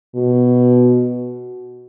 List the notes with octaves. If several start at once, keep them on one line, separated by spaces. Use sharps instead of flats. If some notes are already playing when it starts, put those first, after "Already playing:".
B2